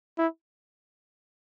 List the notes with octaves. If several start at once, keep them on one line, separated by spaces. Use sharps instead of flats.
E4